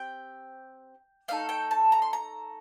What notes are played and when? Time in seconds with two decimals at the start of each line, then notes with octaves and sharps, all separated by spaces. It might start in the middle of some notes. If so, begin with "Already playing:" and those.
Already playing: C4 G4 G5
1.28 A3 D#4 A4 F5
1.49 G5
1.71 A5
1.92 A#5
2.02 C6
2.13 A#5